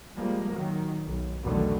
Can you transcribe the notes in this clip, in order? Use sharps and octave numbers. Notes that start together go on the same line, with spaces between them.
F3 G3 G#3 A#3
A#2 D#3 F#3
B1
B1 E2 B2 D3 D#3 A3